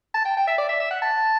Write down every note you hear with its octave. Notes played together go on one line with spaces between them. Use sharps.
A5
G5
G5
E5
D5
E5
E5
F#5
A5